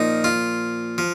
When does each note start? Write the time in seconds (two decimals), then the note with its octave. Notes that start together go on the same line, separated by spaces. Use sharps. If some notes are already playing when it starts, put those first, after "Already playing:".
Already playing: A#2 F3 D#4
0.24 F4
0.98 F3